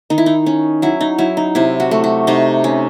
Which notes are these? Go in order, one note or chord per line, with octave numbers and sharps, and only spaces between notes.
D#3 D#4
E4
D#4
C#4
F#3 E4
D#4
F#3 E4
D#4
C3 E4
F#4
A3
F#4
C3 D#4
C#4